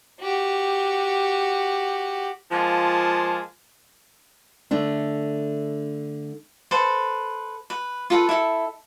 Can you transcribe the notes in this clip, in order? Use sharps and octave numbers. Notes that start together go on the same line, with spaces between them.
F#4 G4
F3 G#3 A#3 F4 F5 A5
D3 A3 D4
A4 B4 C5
B4
F4 A4 B4
E4 A4